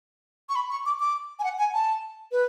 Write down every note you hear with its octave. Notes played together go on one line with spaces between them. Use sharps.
C#6
B5
C#6
D6
D6
G#5
F#5
G#5
A5
B4